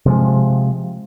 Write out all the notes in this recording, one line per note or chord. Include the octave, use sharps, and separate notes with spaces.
C3 F3 G#3